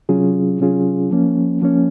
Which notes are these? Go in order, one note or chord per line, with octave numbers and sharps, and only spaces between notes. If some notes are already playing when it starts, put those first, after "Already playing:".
C3 F#3 C#4 F4 G#4
C3 F#3 C#4 F4 G#4
F3 A#3 C#4
F3 A#3 C#4